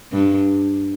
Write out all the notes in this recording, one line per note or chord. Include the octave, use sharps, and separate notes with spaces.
G2